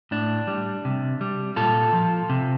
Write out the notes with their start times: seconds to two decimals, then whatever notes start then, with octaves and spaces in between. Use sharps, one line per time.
0.11 A2 D4
0.47 G3
0.85 C3
1.21 G3
1.56 A#2 F4 A4
1.93 F3
2.29 C3